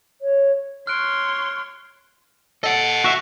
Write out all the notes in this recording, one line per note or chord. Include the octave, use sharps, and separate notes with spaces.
C#5
C#5 C6 F6 F#6 D7
A4 D#5 F#5
F#4 E5